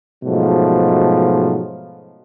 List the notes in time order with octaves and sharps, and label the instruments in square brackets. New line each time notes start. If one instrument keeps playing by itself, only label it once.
[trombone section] G#2 B2 F3 F#3 A3